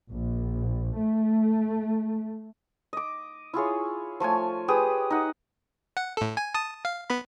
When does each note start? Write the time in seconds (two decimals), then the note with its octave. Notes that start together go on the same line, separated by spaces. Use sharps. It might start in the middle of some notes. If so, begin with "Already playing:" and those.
0.11 A#1
0.98 A3
2.93 D#5 D6
3.54 E4 F4 G#4 C#5
4.20 F3 A3 C#5 G#5
4.68 G4 G#4 B4 D#6
5.10 D#4 F#5
5.97 F#5
6.17 A2 A4
6.37 G#5
6.54 A5 D#6
6.85 F5
7.10 B3 B5